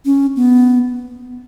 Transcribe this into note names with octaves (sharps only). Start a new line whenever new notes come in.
C#4
B3